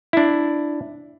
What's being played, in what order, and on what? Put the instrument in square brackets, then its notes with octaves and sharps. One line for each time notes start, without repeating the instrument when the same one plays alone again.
[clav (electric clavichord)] D4 E4